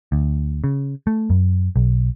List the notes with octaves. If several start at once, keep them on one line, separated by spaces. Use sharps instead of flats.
D2
C#3
A3
F#2
B1